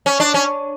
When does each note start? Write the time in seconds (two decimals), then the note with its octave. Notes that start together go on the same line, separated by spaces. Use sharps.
0.06 C#4
0.20 D4
0.34 C#4